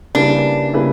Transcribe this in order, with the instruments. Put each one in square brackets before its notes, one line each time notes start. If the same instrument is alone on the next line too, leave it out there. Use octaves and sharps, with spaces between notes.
[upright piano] C#3 G3 A#3 E4 B4 [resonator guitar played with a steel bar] D4
[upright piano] C#3 G3 A#3 E4 B4